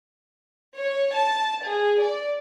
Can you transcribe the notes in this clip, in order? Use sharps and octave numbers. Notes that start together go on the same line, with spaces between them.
C#5
A5
G#4
D5